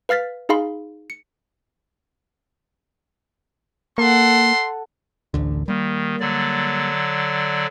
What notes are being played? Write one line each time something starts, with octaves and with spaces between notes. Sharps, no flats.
B4 F5 F6 A6 B6
D#4 G#4 F5 B5 C6
C#7
A#3 A4 F#5 C6
A1 D2 D3
D#3 G3 A#3
D3 F#3 D5